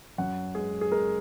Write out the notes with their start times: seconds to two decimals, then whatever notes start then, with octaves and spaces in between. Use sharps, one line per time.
0.18 F#2 F#5
0.55 G#3 G#4
0.81 G#4
0.92 G#3 A#4